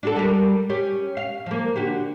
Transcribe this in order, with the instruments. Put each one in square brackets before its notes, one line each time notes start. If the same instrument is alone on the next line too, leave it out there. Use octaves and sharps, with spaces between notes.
[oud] D4 F#4 A4
G3 A4 A#4
C#4 G4
F5
F3 A#3
D3 F#4 G4